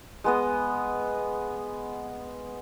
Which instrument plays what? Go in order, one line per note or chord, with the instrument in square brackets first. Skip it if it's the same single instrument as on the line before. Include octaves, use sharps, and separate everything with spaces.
[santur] G#3 B3 D#5